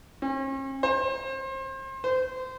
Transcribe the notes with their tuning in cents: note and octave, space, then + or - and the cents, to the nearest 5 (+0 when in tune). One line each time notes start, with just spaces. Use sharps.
C#4 -45
C5 +30
C5 -25